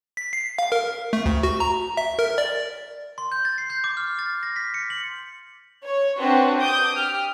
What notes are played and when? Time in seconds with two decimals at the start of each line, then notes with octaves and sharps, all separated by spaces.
0.17 B6
0.33 C7
0.59 F5
0.72 A#4
1.13 A3
1.26 D2
1.43 F#4
1.60 A#5
1.97 E5
2.19 A#4
2.38 D5
3.18 C6
3.32 G6
3.45 A6
3.58 C7
3.70 G6
3.84 D6
3.97 F6
4.19 A6
4.43 A#6
4.56 B6
4.74 C#7
4.90 F#7
5.84 C#5
6.19 C4 D4 F#4 B4 C5
6.61 D6 D#6 G6
6.96 G4 F6